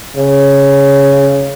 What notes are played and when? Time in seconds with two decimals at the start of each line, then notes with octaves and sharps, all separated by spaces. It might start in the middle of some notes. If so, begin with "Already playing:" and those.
0.17 C#3